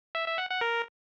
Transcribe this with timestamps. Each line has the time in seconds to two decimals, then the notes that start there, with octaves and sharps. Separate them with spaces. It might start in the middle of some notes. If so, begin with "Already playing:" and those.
0.15 E5
0.26 E5
0.38 F#5
0.50 F#5
0.61 A#4